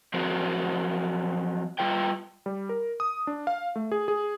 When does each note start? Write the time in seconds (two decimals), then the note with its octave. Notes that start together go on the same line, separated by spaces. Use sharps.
0.14 F3 F#3 C4 F#4 A#4 C5
1.79 G3 F4 B4 G5
2.46 G3
2.69 A#4
3.00 D#6
3.27 D4
3.47 F5
3.76 A3
3.92 G#4
4.08 G#4